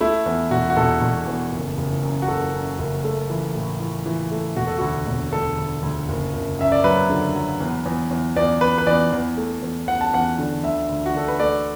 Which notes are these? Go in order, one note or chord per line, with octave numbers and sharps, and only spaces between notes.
A3 E4
E2
E1 F#4
F#4
E1 A4
E1
E2
F#1
F#1
F#2
F#4
F#1 A4
F#2
F#1
A3
E3
A2
E3
E3
A3
E1 F#4
A4
D2 F#4
E1
D2 A4
D2
D2
F#1
F#1
F#2 E5
D5
F#3 B4
D3
F#3
E2
E2
E2
E2 D5
E2 B4
B4
E2 D5
E2
A3
E2
E2 F#5
A5
E2 F#5
D3
D2 E5
D2
F#4
D3 A4
B4
A3 D5